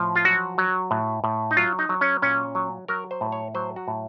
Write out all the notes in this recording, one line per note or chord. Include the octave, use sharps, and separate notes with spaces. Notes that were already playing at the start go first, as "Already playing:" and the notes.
Already playing: A2 F3
F4
F#3 F#4
F#3
A2
A2
D#4
F#3 F4
D#4
F#3
C#4
A#2 C#4
F#3
F#3 A#4
C5
A2
C#5
F#3 C5
F#4
A2